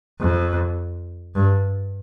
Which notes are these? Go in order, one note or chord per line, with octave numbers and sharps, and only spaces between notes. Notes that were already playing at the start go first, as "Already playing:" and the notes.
F2
G2